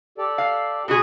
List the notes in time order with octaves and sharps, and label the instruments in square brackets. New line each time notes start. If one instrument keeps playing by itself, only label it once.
[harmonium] G4 A4 D5
[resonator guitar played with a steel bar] F5
B2 F#4 G#4